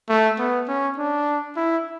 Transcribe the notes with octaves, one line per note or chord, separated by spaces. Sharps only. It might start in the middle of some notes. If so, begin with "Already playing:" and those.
A3
B3
C#4
D4
E4